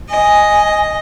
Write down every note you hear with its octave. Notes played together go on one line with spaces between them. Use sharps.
D#5 G#5